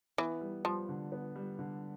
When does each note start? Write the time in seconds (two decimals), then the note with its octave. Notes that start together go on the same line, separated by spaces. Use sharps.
0.18 E3 B3
0.41 G3
0.65 F3 G3
0.89 D3
1.12 B3
1.36 G3
1.59 D3